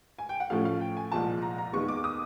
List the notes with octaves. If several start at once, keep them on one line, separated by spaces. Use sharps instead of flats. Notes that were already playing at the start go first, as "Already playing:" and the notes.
G#5
G5
F#5
A2 F3 A3 C#4 F5
F5
G5
G#5
C2 A#2 F3 G#3 A5
A#5
A#5
D#2 D#3 G#3 B3 C#6
D6
D#6